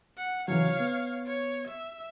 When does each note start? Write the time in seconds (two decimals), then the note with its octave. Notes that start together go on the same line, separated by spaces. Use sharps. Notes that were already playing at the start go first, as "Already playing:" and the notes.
0.18 F#5
0.48 C#3 E3 F#3 C#5 F5
0.80 B3
1.26 C#5
1.68 E5